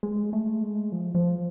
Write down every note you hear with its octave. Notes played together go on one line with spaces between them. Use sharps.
G#3
A3
G#3
F3
F3